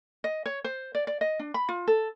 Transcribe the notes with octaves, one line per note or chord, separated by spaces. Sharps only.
D#5
C#5
C5
D5
D5
D#5
D4
B5
F4
A4